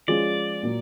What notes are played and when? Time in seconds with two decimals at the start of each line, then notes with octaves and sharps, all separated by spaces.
0.08 F3 G#3 C#4 F4 D5
0.63 A#2 F#3 A#3